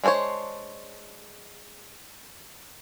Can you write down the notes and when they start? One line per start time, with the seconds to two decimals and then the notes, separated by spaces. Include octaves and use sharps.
0.04 G#3 D4 A4 C5 C#5